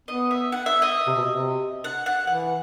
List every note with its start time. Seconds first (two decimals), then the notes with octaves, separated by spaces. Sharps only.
0.08 B3 D#5
0.31 E5
0.52 F#5
0.66 E5
0.82 D#5
1.07 C3
1.17 B2
1.29 C3
1.84 F#5
2.06 F#5
2.27 E3 F#5